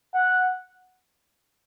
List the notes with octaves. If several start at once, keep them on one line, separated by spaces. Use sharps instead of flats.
F#5